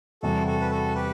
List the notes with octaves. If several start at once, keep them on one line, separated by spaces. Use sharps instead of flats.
E2 C3 G3 F#4 A4
F#4 A4
B4
F#4 A4
G4 B4